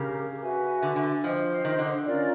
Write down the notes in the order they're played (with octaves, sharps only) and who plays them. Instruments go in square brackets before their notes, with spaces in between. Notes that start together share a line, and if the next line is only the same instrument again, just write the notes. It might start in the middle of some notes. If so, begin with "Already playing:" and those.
Already playing: [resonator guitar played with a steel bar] C#3 [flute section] G4 A#4
[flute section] F#4 B4 E5 G#5
[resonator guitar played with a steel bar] D3
D3
[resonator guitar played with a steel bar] F3 [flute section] C5 D#5 G5
[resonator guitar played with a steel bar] D#3
D3
[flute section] C#4 F4 A#4 D5